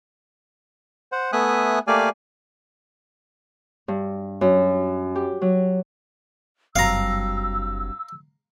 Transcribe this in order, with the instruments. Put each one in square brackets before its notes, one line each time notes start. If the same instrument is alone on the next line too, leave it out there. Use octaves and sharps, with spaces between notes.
[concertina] C5 F#5
A3 B3 E5 G#5 D#6 F#6
A3 A#3 G4 D5 F5 G#5
[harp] G2
F#2
G4
F#3
[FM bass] F#1 [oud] G2 F#3 C4 [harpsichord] F5 A#5 [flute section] E6